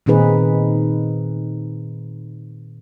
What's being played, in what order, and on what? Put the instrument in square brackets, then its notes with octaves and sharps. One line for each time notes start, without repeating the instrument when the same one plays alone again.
[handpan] A#2 D#3 C4 D#4 G#4 B4